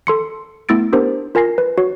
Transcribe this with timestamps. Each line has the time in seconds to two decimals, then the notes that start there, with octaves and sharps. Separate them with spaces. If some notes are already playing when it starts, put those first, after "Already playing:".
0.07 A4 C6 C#7
0.69 A3 B3 E4 E6 A6 D7
0.93 B3 D4 G4 A#4 C5
1.35 F4 A#4 G#5 A#6 C7
1.58 B4
1.78 F#4 C#5